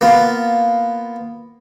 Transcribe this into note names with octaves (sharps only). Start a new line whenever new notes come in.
A#3 B3 F4